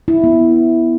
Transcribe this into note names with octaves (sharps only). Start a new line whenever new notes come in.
E4
B3